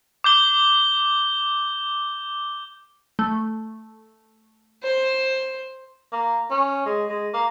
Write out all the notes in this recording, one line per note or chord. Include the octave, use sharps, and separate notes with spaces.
D6 G6 G7
A3
C5
A#3
C#4
G#3
G#3
A#3